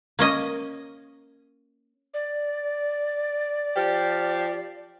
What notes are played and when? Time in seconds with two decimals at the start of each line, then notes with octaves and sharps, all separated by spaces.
0.19 A#3 C#4 D#5
2.14 D5
3.75 F3 G4